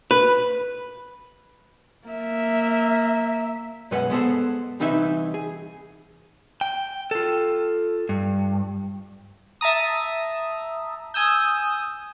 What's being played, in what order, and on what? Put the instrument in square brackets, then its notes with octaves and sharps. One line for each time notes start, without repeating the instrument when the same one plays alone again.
[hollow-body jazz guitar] B4
[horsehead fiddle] A#3 E5
[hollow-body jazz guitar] F#2 B2 G#3 B4 F#5
G#3 B3 A4 C5
C2 E3 C4 D#4 B4 E5
G#4
[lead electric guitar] G5
F4 A4
G2
[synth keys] E5 A5 A#5 D#6
G#5 D#6 E6 G6